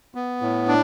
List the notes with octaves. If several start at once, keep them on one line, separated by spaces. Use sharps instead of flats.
B3
A2
D4